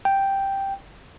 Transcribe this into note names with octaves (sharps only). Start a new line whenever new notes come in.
G5